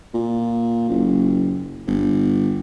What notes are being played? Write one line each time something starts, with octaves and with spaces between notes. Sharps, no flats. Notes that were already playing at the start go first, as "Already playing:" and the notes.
A#2
F#1
G1